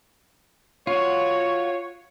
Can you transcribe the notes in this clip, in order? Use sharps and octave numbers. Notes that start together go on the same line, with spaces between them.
F4 F#4 C#5